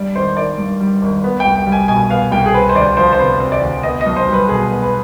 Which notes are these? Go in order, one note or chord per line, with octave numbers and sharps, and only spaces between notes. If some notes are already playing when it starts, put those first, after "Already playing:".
Already playing: G2 G3 D5
G#1 C5
D#3 D5
G2
G3
G#1
B3
C2 G5
G5
G3
G#5
B2 G#5
B3 F5
C2 G5
G#4
C4 B4
C5
D2 D5
F3 C5
C5
C3 B4
C4
D5
D2
B3 D#5
D#5
B1
C5
G3
B4
B2 G#4
B3
B4